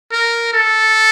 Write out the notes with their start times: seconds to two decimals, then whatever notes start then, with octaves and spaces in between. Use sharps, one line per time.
0.12 A#4
0.53 A4